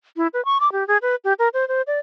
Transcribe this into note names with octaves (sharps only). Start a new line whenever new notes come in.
E4
B4
C#6
D6
G4
G#4
B4
G4
A#4
C5
C5
D5